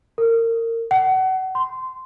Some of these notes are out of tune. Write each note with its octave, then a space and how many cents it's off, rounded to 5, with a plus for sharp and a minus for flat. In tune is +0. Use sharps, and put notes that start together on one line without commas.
A#4 -30
F#5 +30
C6 -15